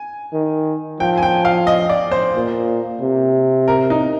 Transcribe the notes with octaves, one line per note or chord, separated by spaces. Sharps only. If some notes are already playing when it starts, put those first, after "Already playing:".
Already playing: G#5
D#3
F3 G5
G#5
G5
F5
D#5
D5
C5
A#2
C3
A#4
D#4